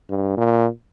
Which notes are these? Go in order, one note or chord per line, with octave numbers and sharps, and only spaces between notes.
G2
A#2